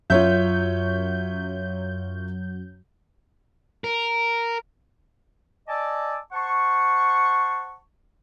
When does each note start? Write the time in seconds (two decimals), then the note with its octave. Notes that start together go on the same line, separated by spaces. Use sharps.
0.10 F#2 F#3 F4 C#5 E5 G6
3.84 A#4
5.68 D5 D#5 G#5 A5 D6 E6
6.33 C5 F#5 A5 C#6